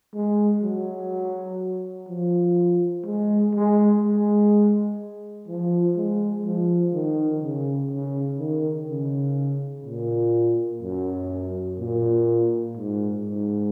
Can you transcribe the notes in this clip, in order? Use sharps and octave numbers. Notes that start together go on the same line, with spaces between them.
G#3
F#3
F3
G#3
G#3
G#3
F3
G#3
F3
D#3
C#3
C#3
D#3
C#3
A#2
F#2
A#2
G#2
G#2